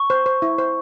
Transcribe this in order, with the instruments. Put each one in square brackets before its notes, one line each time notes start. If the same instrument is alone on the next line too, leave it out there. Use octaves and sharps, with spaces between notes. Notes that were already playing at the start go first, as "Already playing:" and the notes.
Already playing: [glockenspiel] C#6
[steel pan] C5
C5
E4
C5